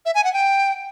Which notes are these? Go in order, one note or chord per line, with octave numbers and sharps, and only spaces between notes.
E5
G#5
F#5
G5